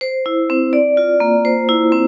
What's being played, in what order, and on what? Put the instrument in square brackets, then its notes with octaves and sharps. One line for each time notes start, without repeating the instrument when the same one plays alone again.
[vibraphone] C5
E4
C4
D5
F4
A#3
C5
E4
C4